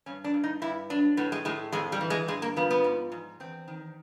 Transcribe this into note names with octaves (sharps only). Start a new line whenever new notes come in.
G2 C#4
D4
G2
D#4
G2 E4
F#3 D4
A2 B3
G#3
A2 G#3
F2 G#3
G3
E3
G#3
G2 G#3
A#3
F3 B3
B3
G#2
G#2
E2 C4
D#3